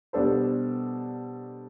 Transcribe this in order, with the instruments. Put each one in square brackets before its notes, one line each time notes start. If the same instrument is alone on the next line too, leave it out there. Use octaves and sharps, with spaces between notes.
[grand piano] B2 G3 D4 A4 C5